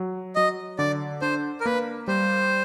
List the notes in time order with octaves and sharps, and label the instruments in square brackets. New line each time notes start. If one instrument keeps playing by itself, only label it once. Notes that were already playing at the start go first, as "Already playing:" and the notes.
Already playing: [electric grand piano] F#3
[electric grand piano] F#3 [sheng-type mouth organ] D#5
[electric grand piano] D3 [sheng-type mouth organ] D5
[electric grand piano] D4 [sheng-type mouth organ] C5
[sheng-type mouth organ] A#4
[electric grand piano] A#3 [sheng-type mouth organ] B4
[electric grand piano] G3 [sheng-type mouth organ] C5